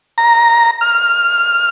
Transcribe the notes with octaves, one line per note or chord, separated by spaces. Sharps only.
A#5
F6